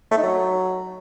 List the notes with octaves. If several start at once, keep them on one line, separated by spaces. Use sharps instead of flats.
A3
D#4
F#3